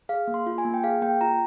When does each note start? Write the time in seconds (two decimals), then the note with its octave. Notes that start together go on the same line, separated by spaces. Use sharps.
0.09 G#4 F5
0.27 A#3
0.34 C6
0.46 F4
0.58 G#5
0.65 A#3
0.74 G5
0.83 G#4 F5
1.02 A#3 G5
1.21 F4 A#5